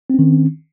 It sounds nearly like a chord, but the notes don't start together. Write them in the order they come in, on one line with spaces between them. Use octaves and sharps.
C4 C#4 D#3